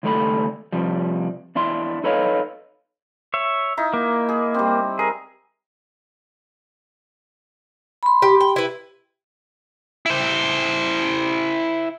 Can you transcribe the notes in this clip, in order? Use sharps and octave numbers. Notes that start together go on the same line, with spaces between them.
C#2 D#3 G3 A3 A4 B5
C3 F3 G3
E2 D4 E4 C6
D#4 A4 B4 C#5 D#5 F5
C#5 E5
D#4 E4
A#3
G#4
G3 C4
G#4 A#4
B5 C6
G4
G5
E4 B4
E4 C5